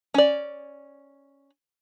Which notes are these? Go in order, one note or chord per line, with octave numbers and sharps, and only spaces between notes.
C#4 D5